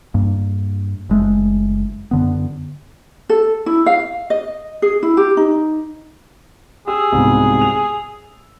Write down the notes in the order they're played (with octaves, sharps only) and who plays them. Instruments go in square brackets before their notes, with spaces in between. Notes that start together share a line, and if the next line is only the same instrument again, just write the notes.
[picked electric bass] G2 A#3
F#1 G#3 A3
F#2 D3 B3
[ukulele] A4
E4
F5
D#5
G#4
E4
G4
D#4
[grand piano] G4 E6 [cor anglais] G#4
[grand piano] C2 G#2 B2
F7